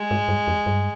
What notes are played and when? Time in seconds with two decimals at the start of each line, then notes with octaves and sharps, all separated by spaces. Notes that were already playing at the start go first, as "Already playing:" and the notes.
Already playing: G#3
0.11 G#2
0.28 G2
0.48 F2
0.66 G2